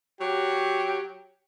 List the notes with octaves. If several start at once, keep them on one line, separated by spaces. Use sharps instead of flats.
F#3 G4